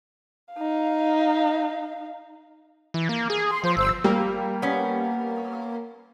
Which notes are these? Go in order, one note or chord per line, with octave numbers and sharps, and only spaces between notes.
D#4 F5
E3
A#3
G#4
C6
F3 C5
G1 C5 E6
G3 A#3
B3 C#4